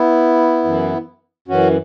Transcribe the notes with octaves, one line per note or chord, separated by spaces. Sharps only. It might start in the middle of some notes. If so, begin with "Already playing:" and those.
Already playing: B3 E4
F#2 E3
F#2 E3 C#4 F#4